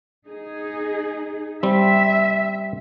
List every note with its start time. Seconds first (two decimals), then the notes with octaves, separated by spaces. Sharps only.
0.27 D#4 G#4
1.63 G3 C4 E5